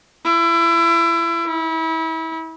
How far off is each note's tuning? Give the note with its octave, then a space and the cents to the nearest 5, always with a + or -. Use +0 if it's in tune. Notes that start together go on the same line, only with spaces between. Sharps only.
E4 +30
E4 -30